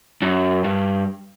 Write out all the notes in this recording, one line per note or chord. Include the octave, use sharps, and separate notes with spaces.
F#2
G2